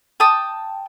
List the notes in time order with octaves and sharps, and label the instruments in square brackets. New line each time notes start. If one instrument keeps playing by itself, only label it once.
[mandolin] G5 A5 D#6